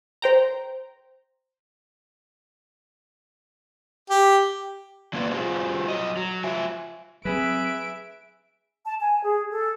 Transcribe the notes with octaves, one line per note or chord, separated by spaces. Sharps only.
C5 G5 A#5
G4
F#3 A#3 C#4 F4 B4 D5
F4 F#4 G#4 C5
F#3 D5 D#5
F#3
F4 E5 G#5
F#3 C4 G#4 B4 E5 E6 B6 D7
A5
G#5
G#4
A4